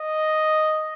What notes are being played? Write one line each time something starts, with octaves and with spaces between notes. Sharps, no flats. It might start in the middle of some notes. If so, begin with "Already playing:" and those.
Already playing: D#5